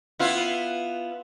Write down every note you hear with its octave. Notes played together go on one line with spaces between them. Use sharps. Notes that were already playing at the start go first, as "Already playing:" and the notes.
B3 E4 F4